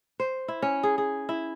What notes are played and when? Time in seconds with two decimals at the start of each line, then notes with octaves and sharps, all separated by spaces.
0.20 C5
0.48 E4
0.62 C#4
0.83 G#4
0.98 G#4
1.29 E4